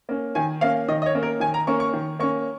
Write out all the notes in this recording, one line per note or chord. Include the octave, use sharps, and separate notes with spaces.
A#3 C#4
D#3 G#5
A#3 C#4 F5
D#3 D#5
D#5
C#5
A#3 C#4
A#4
D#3 G#5
A#5
A#3 C#4 C#6
C#6
D#3
A#3 C#4 C#6